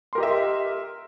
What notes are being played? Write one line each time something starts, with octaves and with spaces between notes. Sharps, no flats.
G4 A#4 D#5 E5 C6